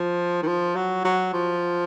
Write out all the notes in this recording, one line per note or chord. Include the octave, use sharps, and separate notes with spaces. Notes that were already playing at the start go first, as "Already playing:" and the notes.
Already playing: F3
D#3
F3
F#3
F#3
F3